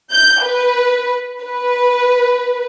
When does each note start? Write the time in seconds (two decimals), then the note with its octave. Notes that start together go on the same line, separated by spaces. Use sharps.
0.13 G6
0.44 B4
1.42 B4